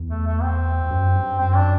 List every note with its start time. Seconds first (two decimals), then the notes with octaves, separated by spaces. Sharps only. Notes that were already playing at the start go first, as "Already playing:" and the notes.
Already playing: E2
0.10 A3
0.27 A3
0.43 C4
0.91 F#2
1.15 G2
1.39 F#2 C4
1.56 D4